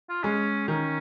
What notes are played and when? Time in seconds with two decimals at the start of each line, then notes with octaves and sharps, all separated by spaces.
0.09 F4
0.23 G#3 C#4
0.68 D#3 C#4